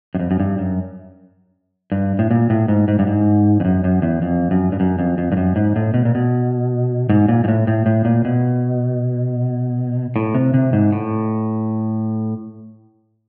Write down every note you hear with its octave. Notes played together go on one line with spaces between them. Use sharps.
F#2
F2
F#2
G2
F#2
G2
A2
A#2
A2
G#2
G#2
G2
G#2
F2
F#2
F#2
E2
F2
F#2
G2
F#2
F2
F2
G2
F#2
G#2
A2
B2
A#2
B2
G#2
A#2
G#2
A2
A2
A2
A#2
B2
A2
C3
C3
G#2
A2